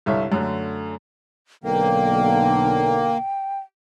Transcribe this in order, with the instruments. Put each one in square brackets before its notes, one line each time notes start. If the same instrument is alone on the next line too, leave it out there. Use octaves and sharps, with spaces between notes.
[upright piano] G1 C2 A4 C#5 E5
F#2 D3 A3
[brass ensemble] B1 D3 [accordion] A#3 [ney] G5